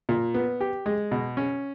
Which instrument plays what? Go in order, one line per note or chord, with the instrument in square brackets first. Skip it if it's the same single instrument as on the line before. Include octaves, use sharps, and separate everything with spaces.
[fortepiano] A#2
B3
G4
G#3
B2
C#4